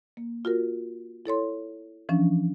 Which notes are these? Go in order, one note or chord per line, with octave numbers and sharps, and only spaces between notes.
A#3
F4 F#4 A#4
E4 A4 C#5 C6
E3 F3 C#4 D4